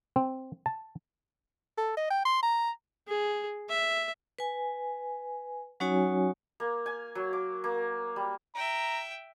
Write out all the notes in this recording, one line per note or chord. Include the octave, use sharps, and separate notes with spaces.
C4
A5
A4
D#5
G5
C6
A#5
G#4
E5
B4 G#5
F#3 C#4 D#4 F#4 C#5 G#5
A#3
G#5
F#3
D6
A#3
G3
E5 G5 A#5